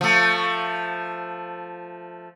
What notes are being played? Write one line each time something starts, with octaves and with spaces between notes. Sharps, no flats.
F3 A3